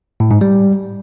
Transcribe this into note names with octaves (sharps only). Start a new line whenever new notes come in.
A2
G#2
G3